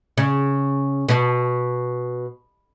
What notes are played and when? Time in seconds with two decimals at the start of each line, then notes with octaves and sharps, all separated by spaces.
0.17 C#3
1.08 B2